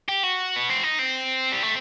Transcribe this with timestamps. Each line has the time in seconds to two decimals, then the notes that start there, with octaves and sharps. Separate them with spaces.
0.09 G4
0.23 F#4
0.56 B3
0.70 C4
0.83 D#4
0.99 C4
1.52 G3
1.63 A3